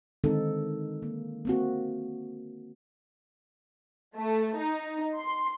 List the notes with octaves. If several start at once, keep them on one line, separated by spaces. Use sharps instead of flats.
D3 D#3 G#3 C4 D#4 A4
A#3
A#3 C4 F#4
A3
D#4
C6